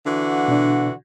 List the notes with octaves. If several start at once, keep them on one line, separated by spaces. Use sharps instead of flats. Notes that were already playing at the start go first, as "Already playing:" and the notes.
D3 E3 F#4
B2 D4